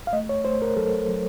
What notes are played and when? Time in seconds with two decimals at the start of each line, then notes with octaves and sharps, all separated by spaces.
0.07 F5
0.13 A3 D#5
0.29 C#5
0.45 A3 C5
0.62 A#4
0.77 F#3 A4
1.09 F#3